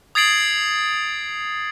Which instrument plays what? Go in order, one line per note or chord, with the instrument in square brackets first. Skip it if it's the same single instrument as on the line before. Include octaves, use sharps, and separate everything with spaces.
[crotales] D#6 G#6 A6 C7 D7 F#7